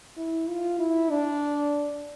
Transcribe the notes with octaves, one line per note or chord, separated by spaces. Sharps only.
E4
F4
E4
D4